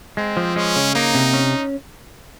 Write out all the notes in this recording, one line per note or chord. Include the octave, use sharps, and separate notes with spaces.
G#3 C4
F3
G#3 C#4
C#3
A#3 D#4
C3
C#4